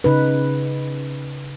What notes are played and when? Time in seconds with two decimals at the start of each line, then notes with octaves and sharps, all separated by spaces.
0.04 C#3 D#4 B4